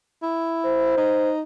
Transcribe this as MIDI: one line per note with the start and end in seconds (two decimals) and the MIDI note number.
0.22 0.95 64
0.65 1.31 72
0.97 1.42 63